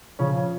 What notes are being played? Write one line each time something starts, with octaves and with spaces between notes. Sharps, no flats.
C#3 F3 C#4